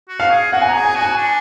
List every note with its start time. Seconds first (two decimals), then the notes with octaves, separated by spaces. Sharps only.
0.09 F#4
0.20 F5
0.31 G#4
0.53 F#4 F#5
0.62 G#5
0.69 A#5
0.74 G#4
0.85 G#5
0.96 F#4
1.01 G#5
1.17 D4